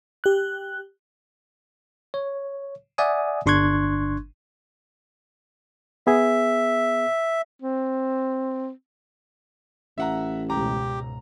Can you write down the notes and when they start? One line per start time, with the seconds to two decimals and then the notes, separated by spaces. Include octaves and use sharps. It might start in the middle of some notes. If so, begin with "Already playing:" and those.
0.24 G4 F#6
2.14 C#5
2.98 D5 E5 F#5 G#5 D#6
3.46 G1 D4 C6 C#6 F#6 G#6
6.07 B3 G#4 E5
7.62 C4
9.98 A1 E5 F#5 A#5
10.50 C#2 G#2 B2 G4 A#5